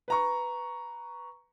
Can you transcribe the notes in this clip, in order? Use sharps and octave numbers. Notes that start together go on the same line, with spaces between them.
B4 A#5 C#6